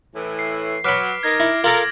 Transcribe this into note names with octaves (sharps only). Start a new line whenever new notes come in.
A2 E3
C7
F#3 B4 B5 D6 F6 D7
D#4 A#4 G#6 A#6
E4 A#6
F4 A4 A#4 F#7